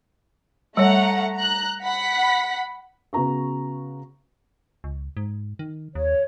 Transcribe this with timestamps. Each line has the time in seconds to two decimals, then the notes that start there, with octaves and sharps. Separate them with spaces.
0.77 G3 A3 C#5 F#5 A#5
1.35 A#5 F#6
1.83 F#5 B5 B6
3.13 C#3 B3 F#4 A#5 C#6
4.84 C#2
5.17 G#2
5.59 D#3
5.95 D#2 C#5